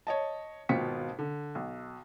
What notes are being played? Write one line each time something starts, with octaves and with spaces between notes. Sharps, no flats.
C#5 D#5 A5
G#1 B2 F4 G5 B6 C#7
D3
B1